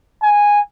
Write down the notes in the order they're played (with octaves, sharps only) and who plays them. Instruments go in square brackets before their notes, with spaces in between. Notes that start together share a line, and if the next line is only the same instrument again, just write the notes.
[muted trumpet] G#5